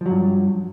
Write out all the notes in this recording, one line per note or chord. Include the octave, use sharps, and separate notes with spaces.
G2 F3 F#3